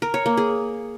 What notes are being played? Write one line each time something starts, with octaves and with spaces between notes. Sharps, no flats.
A#4
C#5
A#3
G#4